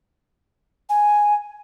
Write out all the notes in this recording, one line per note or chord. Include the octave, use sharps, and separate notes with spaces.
G#5